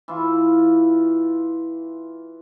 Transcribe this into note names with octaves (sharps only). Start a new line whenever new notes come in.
E3 F4